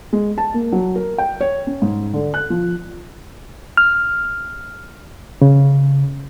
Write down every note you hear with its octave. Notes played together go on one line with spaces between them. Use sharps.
G#3
A5
A#3
F#3
A#4
G5
C#5
C#4
G#2
D3
F#6
F3
F6
C#3